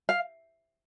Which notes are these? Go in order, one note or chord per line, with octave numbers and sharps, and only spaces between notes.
F5